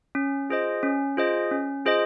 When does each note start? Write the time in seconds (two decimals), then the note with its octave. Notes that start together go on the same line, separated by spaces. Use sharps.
0.15 C#4
0.50 F4 G#4 C5 D#5
0.83 C#4
1.17 F4 G#4 C5 D#5
1.51 C#4
1.85 F4 G#4 C5 D#5